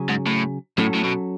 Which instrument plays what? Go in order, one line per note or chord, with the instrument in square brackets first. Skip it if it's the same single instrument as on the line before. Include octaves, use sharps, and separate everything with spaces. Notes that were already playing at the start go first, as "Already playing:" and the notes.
Already playing: [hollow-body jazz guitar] C#3 F#3 C#4 G#4
[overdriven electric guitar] G#2
A2
[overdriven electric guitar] A2 [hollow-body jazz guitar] F#3 C#4 F#4 A4
[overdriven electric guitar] A2
B2